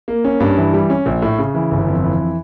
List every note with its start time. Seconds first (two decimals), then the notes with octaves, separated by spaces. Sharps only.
0.08 A#3
0.25 C#4
0.40 G2
0.57 E3
0.74 G3
0.90 C#4
1.06 A#1
1.22 A2
1.38 C#3
1.54 E3
1.71 G1
1.87 F2
2.04 E3